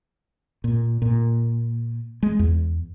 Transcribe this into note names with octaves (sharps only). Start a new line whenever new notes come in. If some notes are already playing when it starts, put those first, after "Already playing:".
A#2
A#2
G#3
E2